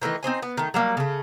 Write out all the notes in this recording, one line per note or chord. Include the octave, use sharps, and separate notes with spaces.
D#3 E3 A3 D#4
C4 D#4 C5 G#5
B3
D#3 A3
F#3 G3 A#3
C#3 A3